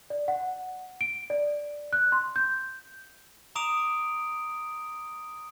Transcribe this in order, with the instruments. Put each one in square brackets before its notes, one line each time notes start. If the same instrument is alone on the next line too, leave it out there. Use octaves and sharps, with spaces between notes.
[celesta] D5
F#5
D7
D5
F#6
C6
G6
[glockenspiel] A#5 D6 D#6 D7 F7